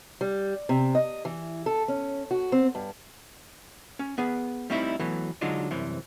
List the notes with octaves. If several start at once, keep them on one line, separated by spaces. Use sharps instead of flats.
G3
C3
D#5
E3
A4
C#4
F#4
C4
G2
C#4
B3 G#4 B4
G3 A3 C4 D#4 E4 E5
E3 F#3 A3 B3
D3 F#3 G#3 D4 D#4 F4
C2 F#2 C3 E3